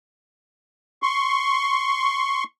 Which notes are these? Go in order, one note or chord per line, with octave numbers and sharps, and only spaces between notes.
C6 C#6